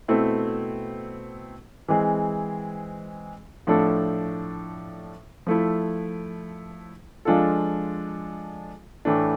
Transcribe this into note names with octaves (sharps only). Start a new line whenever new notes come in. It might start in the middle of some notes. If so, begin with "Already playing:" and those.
B2 A3 C4 E4
E3 G#3 C4 G#4
A2 F3 A3 D4 A4
F3 A3 E4
F3 G#3 D4 F4 A4
A2 E3 A3 D4